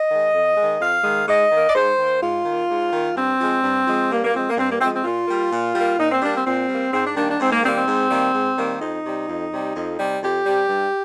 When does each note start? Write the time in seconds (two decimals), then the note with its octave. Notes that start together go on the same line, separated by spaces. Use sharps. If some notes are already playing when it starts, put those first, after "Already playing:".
Already playing: D#5
0.11 D#3 G#3
0.34 F2
0.57 G#3
0.62 D#3
0.80 F2 F5
1.04 D#3 G#3
1.28 G#2 D#5
1.51 D#3 A#3
1.69 D5
1.75 G#2 C5
1.99 D#3 A#3
2.22 G#2 F4
2.45 D#3 A#3
2.70 G#2
2.92 D#3 A#3
3.16 G2 C4
3.40 F3 G#3
3.63 G2
3.87 F3 G#3
4.11 G2 A#3
4.24 A#3
4.33 F3 G#3 C4
4.49 A#3
4.58 G2 C4
4.69 A#3
4.81 F3 G#3 C4
4.93 C4
5.04 A#2 F4
5.28 G3 A#3
5.52 A#2
5.75 G3 A#3
5.99 A#2 D#4
6.11 C4
6.22 G3 A#3 D4
6.34 C4
6.46 A#2 C4
6.69 G3 A#3
6.93 G#2 C4
7.05 D4
7.16 D#3 G3 A#3 D4
7.28 D4
7.40 G#2 C4
7.52 A#3
7.63 D#3 G3 A#3 C4
7.76 C4
7.87 G#2
8.11 D#3 G3 A#3
8.34 G#2
8.58 D#3 G3 A#3
8.81 F2 D#4
9.05 C3 G3
9.28 F2
9.52 C3 G3
9.76 F2
9.99 C3 G3
10.22 F2 G4
10.46 C3 G3
10.69 G2